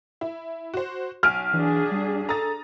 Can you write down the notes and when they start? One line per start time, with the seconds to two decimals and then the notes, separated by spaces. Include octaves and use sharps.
0.21 E4
0.74 F#4 C5
1.23 B1 G#5 F6 D7
1.53 E3 D4 G#4
1.91 G3
2.29 A4 A#5 D#6 A6